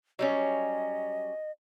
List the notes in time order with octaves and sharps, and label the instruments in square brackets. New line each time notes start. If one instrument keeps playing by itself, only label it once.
[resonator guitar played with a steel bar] F#3 G3 C#4 [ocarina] D#5